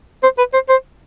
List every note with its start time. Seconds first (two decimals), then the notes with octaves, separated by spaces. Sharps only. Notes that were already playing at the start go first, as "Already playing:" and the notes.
0.23 C5
0.38 B4
0.53 C5
0.69 C5